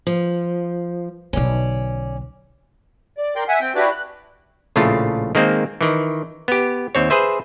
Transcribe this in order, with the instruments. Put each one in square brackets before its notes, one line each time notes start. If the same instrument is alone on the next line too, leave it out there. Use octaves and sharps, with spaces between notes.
[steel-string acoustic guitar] F3
[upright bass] B1 D3 [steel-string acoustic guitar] C#4 D5
[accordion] D5
A#4 D5 G5 C6
E5 F#5 G#5
C4 G5
D4 E4 F#4 G4 B4 D5
F#6
[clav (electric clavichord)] A#1 A2 C#3 A3 F4
D#3 G#3 A#3 C4
D#3 E3
B3 G4
D#2 C4 C#5
G#4 B4 C5 E5